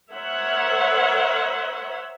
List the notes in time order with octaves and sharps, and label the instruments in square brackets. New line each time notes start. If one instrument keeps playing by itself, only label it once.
[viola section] A#4 C5 C#5 E5 F#5